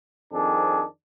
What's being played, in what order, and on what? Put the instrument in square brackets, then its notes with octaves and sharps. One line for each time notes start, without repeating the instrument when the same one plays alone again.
[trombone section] F2 D#3 C4 D4 G#4